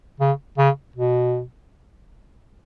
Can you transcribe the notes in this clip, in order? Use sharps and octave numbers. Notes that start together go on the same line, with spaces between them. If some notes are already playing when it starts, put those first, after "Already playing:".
C#3
C#3
B2